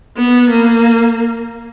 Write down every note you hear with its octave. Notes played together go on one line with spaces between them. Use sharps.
B3
A#3